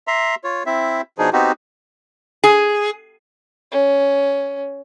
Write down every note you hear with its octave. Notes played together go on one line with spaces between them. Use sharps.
E5 A#5 C6
F4 C#5
C4 E4 E5
B2 F3 D4 D#4 G#4
B3 C4 D#4 F#4 G4
G#4
C#4